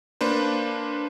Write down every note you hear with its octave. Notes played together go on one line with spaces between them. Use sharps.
A#3 D4 B4 C5